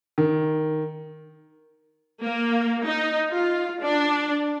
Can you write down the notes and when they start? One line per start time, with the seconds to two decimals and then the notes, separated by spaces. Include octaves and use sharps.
0.18 D#3
2.24 A#3
2.87 D#4
3.30 F4
3.81 D4